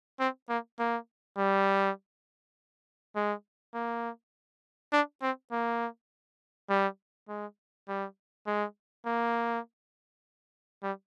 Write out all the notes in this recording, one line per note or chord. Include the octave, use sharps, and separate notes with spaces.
C4
A#3
A#3
G3
G#3
A#3
D4
C4
A#3
G3
G#3
G3
G#3
A#3
G3